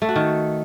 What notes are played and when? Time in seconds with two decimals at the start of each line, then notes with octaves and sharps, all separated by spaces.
0.02 A3
0.09 F#4
0.16 D#3